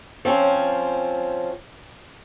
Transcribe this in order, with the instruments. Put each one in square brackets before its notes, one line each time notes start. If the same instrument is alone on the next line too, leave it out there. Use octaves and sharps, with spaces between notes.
[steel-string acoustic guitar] F3 C4 C#4